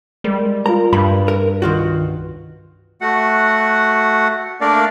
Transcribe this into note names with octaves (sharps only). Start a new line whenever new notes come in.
G3 G#3 A#4
F4 A#4 A#5
G2 G3 B5
A#4
C2 D#3 F4 F#4
A3 F#4 F#5
A3 A#3 D4 A#4 D5 F5